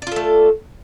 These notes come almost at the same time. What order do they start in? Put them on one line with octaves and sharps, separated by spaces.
D5 F4 A4 A3